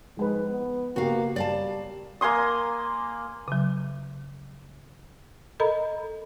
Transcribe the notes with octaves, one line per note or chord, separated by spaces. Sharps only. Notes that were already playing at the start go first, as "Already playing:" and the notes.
G#2 F3 G#3 B4
B3
C#3 A#3 B3 F#4 G4 F5
G3 D5 F5 A5
A#3 G#5 C6 D#6
C#3 F#3
A4 A#4 D#5 A#5 B5